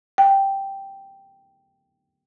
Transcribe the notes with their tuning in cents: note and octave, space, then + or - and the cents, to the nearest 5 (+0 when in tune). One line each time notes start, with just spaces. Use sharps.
G5 -5